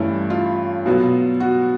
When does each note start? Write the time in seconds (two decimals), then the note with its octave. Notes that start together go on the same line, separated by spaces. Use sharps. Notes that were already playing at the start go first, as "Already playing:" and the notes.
Already playing: G2 E3 A3 C#4 E4
0.30 F4
0.86 B2 F#3 B3
1.40 F#4